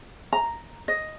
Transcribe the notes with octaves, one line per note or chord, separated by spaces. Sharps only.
A#5
D#5